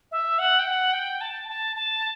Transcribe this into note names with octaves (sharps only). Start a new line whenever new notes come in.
E5
F#5
G5
F#5
G5
A5
A5
A5